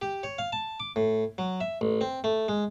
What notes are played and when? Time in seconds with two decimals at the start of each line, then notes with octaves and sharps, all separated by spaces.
0.02 G4
0.23 C#5
0.38 F5
0.52 A5
0.80 D6
0.96 A2
1.38 F#3
1.61 E5
1.81 A1
2.01 C4
2.24 A3
2.48 G#3